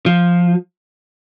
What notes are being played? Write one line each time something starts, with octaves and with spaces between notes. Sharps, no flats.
F3